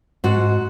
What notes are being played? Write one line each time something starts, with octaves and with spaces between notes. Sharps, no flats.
G#2 F#4